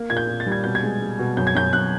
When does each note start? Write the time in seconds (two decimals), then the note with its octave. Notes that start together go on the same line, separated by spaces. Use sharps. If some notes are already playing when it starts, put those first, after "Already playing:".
Already playing: A#3
0.10 A#2 G#6
0.17 G6
0.28 A#2
0.40 A6
0.47 G3
0.52 G#6
0.64 B2 G6
0.75 G#6
0.83 G#3
1.01 G#3
1.19 B2
1.37 F#2 G6
1.47 G#6
1.55 F#2 G6
1.73 F#2 F#6